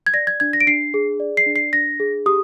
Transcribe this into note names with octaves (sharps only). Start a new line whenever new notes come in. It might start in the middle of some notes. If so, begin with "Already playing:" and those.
G#6
D5 A#6
G#6
D4 G#6
A#6
D7
D4 C7
G#4
D5
C7
D4
C7
D4 A#6
G#4
G4 D#6